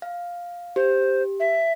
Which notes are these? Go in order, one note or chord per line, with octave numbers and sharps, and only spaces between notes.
F5
G4 C5
E5